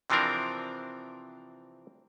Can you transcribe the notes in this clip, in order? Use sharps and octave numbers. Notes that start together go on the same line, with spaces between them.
C3 E3 F3 C4 D4 A#4